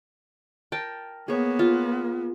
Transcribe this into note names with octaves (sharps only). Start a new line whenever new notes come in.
A#4 G5 A5
A#3 B3 G#4 C#5
F4